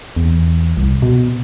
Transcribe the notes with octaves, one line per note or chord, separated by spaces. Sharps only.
E2
C2
B2